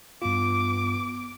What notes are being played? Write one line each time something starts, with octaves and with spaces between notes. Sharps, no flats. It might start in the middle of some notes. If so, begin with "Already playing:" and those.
G2 B3 F4 D6